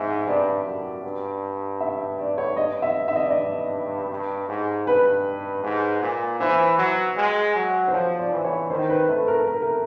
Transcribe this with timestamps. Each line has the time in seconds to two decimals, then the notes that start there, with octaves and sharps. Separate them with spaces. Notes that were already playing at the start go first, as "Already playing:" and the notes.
Already playing: G#2 E5
0.27 G2 D5
0.65 F#2
1.04 G2
1.81 E5
2.18 D5
2.38 C#5
2.56 G2 D#5
2.82 E5
3.08 E5
3.16 D#5
3.23 D5
3.30 D#5
4.10 G2
4.49 G#2
4.87 G2 B4
5.63 G#2
6.02 A#2
6.40 E3 C5
6.78 F#3
7.17 G#3
7.56 F#3
7.88 C5
7.93 F3 C#5
8.19 D5
8.32 E3
8.44 C#5
8.70 D#3 C5
8.90 B4
9.08 A3 B4
9.28 A#4
9.47 A3 A#4
9.62 A#4